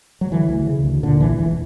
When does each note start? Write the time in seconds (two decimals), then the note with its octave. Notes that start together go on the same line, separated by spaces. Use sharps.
0.21 F#3
0.31 D3 E3
0.49 D2
0.67 C#3
0.85 D2
1.03 A#2 D3
1.20 A#1 E3
1.39 E1 E3